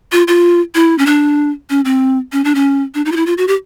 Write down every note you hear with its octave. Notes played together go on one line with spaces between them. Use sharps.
F4
F4
E4
C#4
D4
C#4
C4
C#4
D4
C#4
D4
D#4
F4
E4
F4
F#4
G4